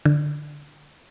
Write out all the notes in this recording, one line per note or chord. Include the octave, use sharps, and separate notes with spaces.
D3